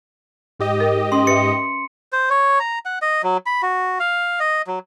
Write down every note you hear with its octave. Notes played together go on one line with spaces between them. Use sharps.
G#2 G4 D#5
A#4
C#4 C6
B4 E5 C#7
C5
C#5
A#5
F#5
D#5
F#3
B5
F#4
F5
D#5
F#3